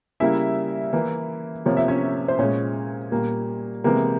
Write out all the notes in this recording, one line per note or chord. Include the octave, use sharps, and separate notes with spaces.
C#3 G3 A#3 E4 E5
E3 A#3
C3 F3 A#3 C#5
E5
C#4 C#5
C5
A#2 G#3 C#4 C#5
A#2 G3 A#3
C3 E3 G#3 A#3 A#4